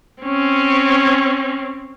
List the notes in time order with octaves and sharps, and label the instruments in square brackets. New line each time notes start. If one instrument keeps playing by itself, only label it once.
[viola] C4 C#4